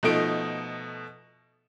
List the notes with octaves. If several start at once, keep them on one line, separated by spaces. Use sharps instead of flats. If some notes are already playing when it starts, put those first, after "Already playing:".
B2 F3 A3 D#4 D7